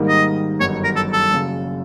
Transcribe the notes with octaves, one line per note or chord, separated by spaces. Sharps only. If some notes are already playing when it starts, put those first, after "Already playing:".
Already playing: G#2 D#3 G3 A#3
D#5
G1 F#2 D#3 F#3 C#5
A#4
A4
A4
F#1 F#2 C#3